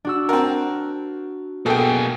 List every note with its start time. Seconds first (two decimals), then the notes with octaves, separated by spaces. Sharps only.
0.05 D4 F#4 E6
0.29 C4 A#4 F#5 A5
1.66 B2 A#3 G#4 A4 G5